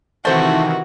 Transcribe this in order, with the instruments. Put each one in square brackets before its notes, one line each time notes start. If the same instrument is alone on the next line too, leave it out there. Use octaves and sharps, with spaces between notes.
[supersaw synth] C3 D#3 E3 [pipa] A3 C5 [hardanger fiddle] F#4